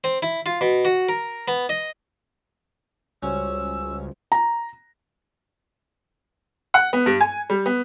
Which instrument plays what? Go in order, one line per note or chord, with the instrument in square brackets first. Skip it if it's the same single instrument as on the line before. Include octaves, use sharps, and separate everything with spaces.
[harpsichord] C4
E4
F4
B2
F#4
A#4
B3
D#5
[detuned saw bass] C#2 [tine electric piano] G3 F#4 C5 [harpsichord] C#4 [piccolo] E6
[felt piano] A#5
[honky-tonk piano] F#5
B3
G2
G#5
G3
B3